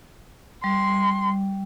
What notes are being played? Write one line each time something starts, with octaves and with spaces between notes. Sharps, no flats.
G3 C6